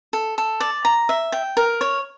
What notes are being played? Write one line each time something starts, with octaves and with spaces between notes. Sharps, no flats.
A4
A4
D5
A#5
E5
G5
A#4
C#5